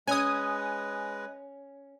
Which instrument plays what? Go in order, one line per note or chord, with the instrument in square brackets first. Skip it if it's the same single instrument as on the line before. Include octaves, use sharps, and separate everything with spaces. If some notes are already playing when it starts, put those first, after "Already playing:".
[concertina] G#3 B4 [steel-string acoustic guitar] C#4 [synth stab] G#5 D#6